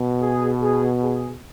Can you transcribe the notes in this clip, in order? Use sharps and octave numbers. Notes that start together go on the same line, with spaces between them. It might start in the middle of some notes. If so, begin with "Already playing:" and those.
Already playing: B2
G#4
G#4
G#4